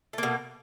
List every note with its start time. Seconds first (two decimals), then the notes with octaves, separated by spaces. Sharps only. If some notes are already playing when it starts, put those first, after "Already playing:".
0.13 A3
0.18 A#3
0.23 B2